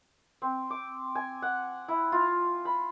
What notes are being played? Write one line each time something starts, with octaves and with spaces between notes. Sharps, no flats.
C4
D6
G#5
F#5
E4
F4
B5